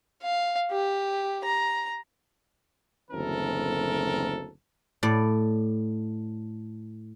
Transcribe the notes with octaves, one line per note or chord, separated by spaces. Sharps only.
F5
G4
A#5
F#1 D2 E3 C4 A4 A#4
A2 D5